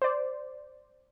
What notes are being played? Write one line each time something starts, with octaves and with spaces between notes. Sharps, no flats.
C5 D5